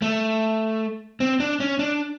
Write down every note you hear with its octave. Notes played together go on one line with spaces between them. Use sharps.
A3
C4
D4
C#4
D4